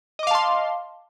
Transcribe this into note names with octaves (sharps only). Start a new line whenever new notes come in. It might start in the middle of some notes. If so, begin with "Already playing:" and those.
D#5 F5 A5 C6 D6